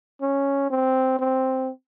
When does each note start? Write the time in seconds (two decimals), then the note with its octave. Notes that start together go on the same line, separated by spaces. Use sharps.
0.22 C#4
0.70 C4
1.19 C4